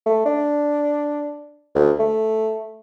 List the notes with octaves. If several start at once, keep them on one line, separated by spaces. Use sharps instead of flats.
A3
D4
D2
A3